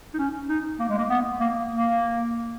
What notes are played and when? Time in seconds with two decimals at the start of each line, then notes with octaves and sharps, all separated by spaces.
0.14 D#4
0.19 C#4
0.49 D#4
0.80 A#3
0.89 G#3
0.98 A#3
1.10 B3
1.40 A#3
1.71 A#3